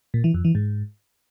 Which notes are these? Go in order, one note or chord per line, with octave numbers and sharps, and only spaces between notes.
A#2
E3
F2
E3
G#2